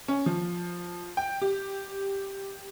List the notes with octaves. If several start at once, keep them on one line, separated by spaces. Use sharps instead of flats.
C#4
F3
G5
G4